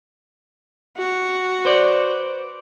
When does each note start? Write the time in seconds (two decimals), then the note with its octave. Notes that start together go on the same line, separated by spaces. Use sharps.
0.98 F#4
1.65 B4 C5 D5